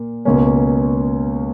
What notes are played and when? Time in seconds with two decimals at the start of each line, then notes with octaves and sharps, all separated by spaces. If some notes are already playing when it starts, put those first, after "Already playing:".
Already playing: A#2 A#3
0.25 C#2 B2 A#3 C#4